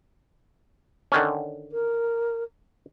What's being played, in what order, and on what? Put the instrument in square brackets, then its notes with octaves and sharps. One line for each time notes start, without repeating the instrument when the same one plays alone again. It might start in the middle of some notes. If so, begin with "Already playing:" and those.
[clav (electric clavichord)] D3 D#3 C#4
[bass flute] A#4